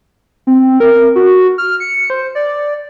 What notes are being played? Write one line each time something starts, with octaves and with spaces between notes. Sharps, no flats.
C4
A#4
F#4
F6
C#7
C5
D5